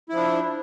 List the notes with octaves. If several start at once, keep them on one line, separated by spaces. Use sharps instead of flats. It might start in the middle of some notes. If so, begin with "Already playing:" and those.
F3 D4 E4